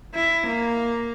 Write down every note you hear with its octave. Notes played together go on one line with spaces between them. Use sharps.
E4
A#3